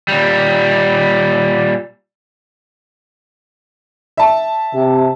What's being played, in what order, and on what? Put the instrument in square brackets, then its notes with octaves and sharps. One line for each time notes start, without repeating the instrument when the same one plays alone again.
[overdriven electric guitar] A#2 G3
[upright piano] E5 A5
[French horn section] C3